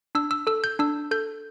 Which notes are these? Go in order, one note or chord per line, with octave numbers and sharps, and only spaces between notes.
D4 E6
E6
A4 E6
G6
D4 E6
A4 G6